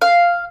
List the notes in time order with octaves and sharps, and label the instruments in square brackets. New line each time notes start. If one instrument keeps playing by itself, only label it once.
[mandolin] F5